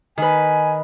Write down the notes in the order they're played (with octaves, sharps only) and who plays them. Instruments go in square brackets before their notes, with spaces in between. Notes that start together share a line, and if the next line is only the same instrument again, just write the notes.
[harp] D#3 B4 [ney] G#5